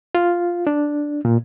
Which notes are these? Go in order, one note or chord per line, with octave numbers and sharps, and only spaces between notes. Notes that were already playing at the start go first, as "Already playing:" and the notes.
F4
D4
A#2